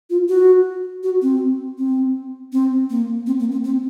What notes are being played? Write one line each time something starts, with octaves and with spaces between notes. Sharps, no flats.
F4
F#4
F#4
C4
C4
C4
A#3
C4
A#3
C4
C4